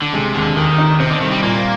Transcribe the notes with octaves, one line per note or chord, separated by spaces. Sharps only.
D3
C3 G#3
D#2 D3
D#2 D#3
D#4
C3 C4
D3
C2 D#3
G3
A#2 A#3